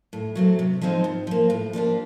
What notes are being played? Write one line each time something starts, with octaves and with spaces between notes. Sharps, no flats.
A2
F#3 A3 C4
C3
F3 G#3 C4 D#4
G#2
F3 A#3
A2
F3 A#3 D4 G4